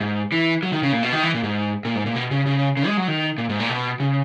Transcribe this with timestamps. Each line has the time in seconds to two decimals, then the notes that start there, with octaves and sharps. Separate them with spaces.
0.01 G#2
0.32 E3
0.63 F#3
0.72 D#3
0.83 C#3
0.92 A#2
1.03 B2
1.13 D#3
1.23 E3
1.34 A#2
1.43 G#2
1.85 A#2
1.95 G#2
2.06 A#2
2.16 B2
2.31 C#3
2.46 C#3
2.77 C#3
2.87 G#3
2.97 F#3
3.08 D#3
3.38 A#2
3.49 G#2
3.60 A#2
3.69 B2
4.00 C#3